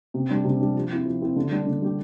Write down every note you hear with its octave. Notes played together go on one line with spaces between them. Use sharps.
C3
G3 D4
C3
G3 D4
F3
C4 E4 G4
F3
C4 E4 G4
D3
G3 D4 G4
D3
G3 D4 G4